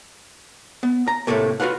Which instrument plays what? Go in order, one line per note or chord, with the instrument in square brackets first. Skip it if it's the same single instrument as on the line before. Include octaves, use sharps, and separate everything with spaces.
[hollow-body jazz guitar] B3
A#5
A2 C3 D#3 A3 A#3
F4 F#4 B4 F5 F#5